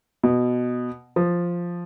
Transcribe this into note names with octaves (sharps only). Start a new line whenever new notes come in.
B2
F3